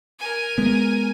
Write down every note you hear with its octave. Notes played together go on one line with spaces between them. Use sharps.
A#4 G#5
G#3 B3